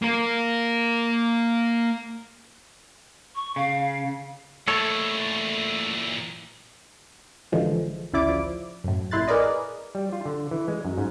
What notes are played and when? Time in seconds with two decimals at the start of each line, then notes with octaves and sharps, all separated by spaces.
0.02 A#3 A#4
3.35 C#6
3.56 C#3 F5
4.68 A#2 E3 A3 A4 C#5
7.52 A1 D3 E3 F3 G#3
8.13 A1 D2 C#3 E4 D5 D6
8.29 F3
8.84 F#2 A2
9.11 A1 A#2 E4 C6 F#6 A6
9.28 G#4 A#4 B4 D5 D#5
9.95 G3
10.13 F4
10.25 D3
10.51 E3
10.68 G#3
10.85 F#2
10.98 G#2